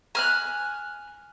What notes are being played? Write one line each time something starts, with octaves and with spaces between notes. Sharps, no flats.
G#5 F6 F#6